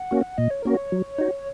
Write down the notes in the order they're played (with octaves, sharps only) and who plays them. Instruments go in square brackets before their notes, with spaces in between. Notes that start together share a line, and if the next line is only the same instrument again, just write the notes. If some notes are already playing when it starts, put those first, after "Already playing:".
Already playing: [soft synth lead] F#5
[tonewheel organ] A#3 C#4 F#4
[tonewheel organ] A#2 [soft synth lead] D#5
[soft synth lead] C#5
[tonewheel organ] A#3 C#4 F#4 [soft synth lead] A#4
[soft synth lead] C#5
[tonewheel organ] F#3
D#4 F#4